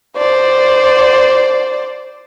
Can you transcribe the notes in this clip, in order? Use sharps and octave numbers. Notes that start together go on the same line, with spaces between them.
C5 D5